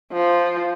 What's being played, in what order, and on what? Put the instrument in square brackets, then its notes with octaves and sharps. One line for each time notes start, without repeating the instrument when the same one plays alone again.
[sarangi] F3